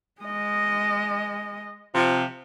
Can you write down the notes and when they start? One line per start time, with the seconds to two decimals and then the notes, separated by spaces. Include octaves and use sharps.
0.22 G#3 D#5
1.94 C3 F3